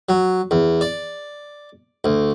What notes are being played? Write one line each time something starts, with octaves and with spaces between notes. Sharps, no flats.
F#3
E2
D5
D2